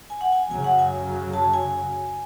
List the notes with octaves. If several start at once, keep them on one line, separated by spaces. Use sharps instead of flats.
G#5
F#5
G#5
F#2 C#3 F#3 G#5
F#5
G#5
A5
G#5